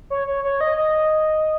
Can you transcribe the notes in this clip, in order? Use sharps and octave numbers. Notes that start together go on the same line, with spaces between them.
C#5
C#5
C#5
D#5
D#5